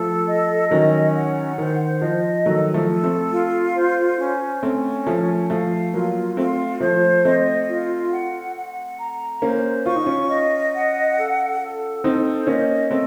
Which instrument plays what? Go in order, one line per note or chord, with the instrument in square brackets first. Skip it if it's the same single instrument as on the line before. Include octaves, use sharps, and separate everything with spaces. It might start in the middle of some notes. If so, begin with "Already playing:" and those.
Already playing: [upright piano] F3 A3 [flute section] A4
[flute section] D#5
[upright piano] D#3 F#3 [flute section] C#4
[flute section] F#5
[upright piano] D#3 [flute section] C5
[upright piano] F3 [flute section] D#5
[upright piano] D#3 F#3 [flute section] A4
[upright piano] F3 A3
[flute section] A4
[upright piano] A3 C4
[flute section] F4
C5
C#4
[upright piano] A3 C4 [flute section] C#4
[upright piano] F3 A3 [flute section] A#4
[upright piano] F3 A3 [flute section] F5
[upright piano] F#3 A#3 [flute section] F4
[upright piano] A3 C4 [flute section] F4
[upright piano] F3 A3 [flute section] C5
[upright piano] A3 C4 [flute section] D#5
[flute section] F4
F#5
F#5
A#5
[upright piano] A#3 C#4 [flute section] C5
[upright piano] F4 [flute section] C#6
[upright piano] D#4
C#4 F4
[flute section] D#5
F#5
A4
A4
[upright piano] C4 D#4 [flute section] C5
[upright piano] A#3 C#4 [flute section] D#5
[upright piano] A3 C4 [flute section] A4